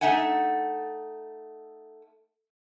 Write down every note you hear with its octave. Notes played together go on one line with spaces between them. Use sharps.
A3 D#4 E5 F#5 G#5